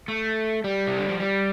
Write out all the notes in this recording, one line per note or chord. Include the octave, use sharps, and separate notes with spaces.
A3
G3
C3
D3
F3
G3